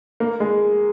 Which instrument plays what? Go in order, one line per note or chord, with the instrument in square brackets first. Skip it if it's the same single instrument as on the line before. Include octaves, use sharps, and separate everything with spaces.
[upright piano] A#3
G#3